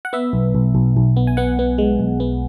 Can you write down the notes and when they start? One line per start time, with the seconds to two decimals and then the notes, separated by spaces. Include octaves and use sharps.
0.05 F#5
0.13 B3 E5
0.33 B1
0.55 B1
0.75 B1
0.97 B1
1.17 B3
1.27 G#5
1.37 B3 F#5
1.59 B3
1.78 G#3
1.99 B1
2.20 B3